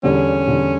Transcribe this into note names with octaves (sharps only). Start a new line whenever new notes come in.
E2 D3 G3 C#4
E2 D3 G3